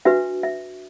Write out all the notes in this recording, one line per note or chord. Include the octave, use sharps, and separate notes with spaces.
D4 F#4 B4 E5
E5